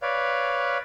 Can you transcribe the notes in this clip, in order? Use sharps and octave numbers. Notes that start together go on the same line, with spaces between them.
B4 C#5 D5 F5